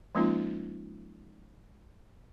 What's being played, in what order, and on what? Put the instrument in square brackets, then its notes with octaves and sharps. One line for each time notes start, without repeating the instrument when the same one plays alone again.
[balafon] F3 G#3 A#3 C#4 D#4 F4